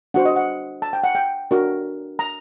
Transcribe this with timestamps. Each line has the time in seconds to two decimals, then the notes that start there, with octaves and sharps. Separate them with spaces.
0.14 D4 F#4 C5 F#5
0.25 D#5
0.36 F#5
0.82 A5
0.93 G5
1.04 F#5
1.15 G5
1.51 D4 F#4 A#4
2.19 A#5